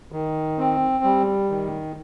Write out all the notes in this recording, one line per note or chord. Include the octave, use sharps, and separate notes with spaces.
D#3
C4
G3
D#3